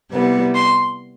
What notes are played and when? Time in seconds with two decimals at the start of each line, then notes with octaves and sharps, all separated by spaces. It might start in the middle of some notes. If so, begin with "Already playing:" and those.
0.10 C3 G3 B3 E4
0.55 C6